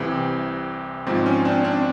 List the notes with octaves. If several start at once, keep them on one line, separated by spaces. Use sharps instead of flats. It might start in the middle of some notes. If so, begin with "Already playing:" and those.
Already playing: C2 C3 E3 C4
G#1 G#2 F3 C4
C#4
C4 D4
C4 D4